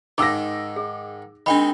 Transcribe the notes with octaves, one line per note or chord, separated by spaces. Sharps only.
G#2 D#3 D#4 D6 E6 A#6
G#4
D#3 G#3 C4 D4 G5 B5